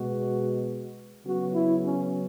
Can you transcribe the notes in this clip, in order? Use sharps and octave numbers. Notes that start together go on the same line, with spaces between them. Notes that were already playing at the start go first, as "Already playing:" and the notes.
Already playing: B2 G#3 B3 F#4
C#3 F#3 B3 F#4
E4
C#4